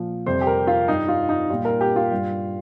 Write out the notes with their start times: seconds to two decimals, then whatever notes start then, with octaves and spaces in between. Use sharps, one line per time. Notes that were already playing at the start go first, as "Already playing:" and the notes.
Already playing: A#2 F3
0.26 F2 C3 G3 C5
0.41 G4
0.47 A#4
0.67 F4
0.88 G2 G3 D#4
1.08 F4
1.29 D#4
1.50 A#2 G3 F4
1.65 A#4
1.81 G4
1.96 F4
2.11 G2 G3